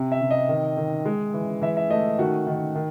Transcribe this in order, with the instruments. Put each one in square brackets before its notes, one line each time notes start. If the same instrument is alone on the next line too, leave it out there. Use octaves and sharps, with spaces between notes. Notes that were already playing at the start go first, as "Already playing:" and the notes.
Already playing: [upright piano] C3
E5
C3
D#5
D#3
D#3
G#3
E3
E3 E5
E5
A3 D#5
D#3 F#4
D#3
D#3